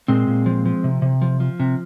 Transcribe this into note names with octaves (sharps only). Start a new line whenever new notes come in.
A#2 G#3 C4
A#2
F3
F3
C3
C3
F3
F3
C3